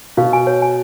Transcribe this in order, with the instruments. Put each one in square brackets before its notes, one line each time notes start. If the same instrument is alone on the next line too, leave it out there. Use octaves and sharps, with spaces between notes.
[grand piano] B2 [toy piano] F5
[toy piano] G#5
C#5
G#5